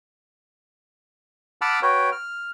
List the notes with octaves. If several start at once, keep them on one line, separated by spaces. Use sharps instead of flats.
F#5 A5 B5 D6 E6 F6
F#4 B4 C#5 G5
F6